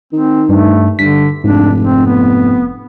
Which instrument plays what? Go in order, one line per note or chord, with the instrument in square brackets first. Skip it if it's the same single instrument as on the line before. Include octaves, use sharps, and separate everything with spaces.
[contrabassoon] D#3 [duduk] C4
[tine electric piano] G2 [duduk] A3
[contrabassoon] G2 [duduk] D3 [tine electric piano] B6
[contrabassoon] F1 [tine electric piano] G#2 [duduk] D4
[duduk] C4
B3